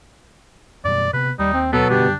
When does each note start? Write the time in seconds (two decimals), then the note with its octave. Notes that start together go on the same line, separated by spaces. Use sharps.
0.85 F#2 B2 G3 D5
1.13 C3 B3 B4
1.39 D#2 G3 D#4
1.54 C4
1.73 B2 F#3 B3 A4
1.90 F#1 D3 G3 D4 G4